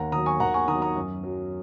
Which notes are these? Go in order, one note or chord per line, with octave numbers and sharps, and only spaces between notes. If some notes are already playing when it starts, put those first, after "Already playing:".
Already playing: D#2 F#5 A#5
D#3 F#3 A#5 D#6
G#5 C#6
D#2 F#5 A#5
G#5 C#6
D#3 F#3 A#5 D#6
A#5 D#6
F#2
F#3